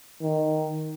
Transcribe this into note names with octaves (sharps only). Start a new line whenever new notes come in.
D#3